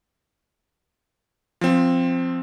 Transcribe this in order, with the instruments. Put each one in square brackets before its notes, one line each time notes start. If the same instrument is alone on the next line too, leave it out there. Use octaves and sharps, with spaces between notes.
[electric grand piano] F3 C4